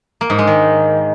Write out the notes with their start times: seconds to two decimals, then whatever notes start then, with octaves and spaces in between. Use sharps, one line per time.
0.21 A#3
0.30 G#2
0.39 G#3
0.47 D#3